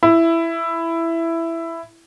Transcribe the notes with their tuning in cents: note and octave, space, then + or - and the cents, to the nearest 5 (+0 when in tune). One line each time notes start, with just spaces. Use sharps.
E4 +10